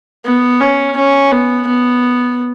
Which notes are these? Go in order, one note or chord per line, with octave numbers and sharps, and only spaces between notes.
B3
C#4
C#4
B3
B3